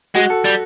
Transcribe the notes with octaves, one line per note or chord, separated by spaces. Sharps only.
G#3 F#4
A4
G3